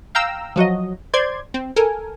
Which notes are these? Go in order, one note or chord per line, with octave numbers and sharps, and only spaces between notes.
F5 G5 A#5 E6
F3 F#3 F#4 D#5
C5 D5 C6 G#6
C4
A4 A#4 G#5